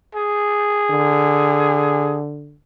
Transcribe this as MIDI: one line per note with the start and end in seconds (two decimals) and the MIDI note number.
0.15 2.20 68
0.91 2.57 50